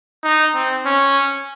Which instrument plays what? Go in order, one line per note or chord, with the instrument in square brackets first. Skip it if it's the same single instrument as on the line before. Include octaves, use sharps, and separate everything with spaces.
[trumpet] D#4
C4
C#4